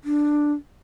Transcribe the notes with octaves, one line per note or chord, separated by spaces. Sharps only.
D4